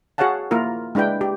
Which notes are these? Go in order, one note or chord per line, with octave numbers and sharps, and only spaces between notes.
F#4 G#4 C#5 F5 F#5 A5
A#3 E4 F4 A#4
G#3 D4 E4 B4 G5
G4